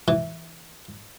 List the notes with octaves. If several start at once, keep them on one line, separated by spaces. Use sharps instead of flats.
E3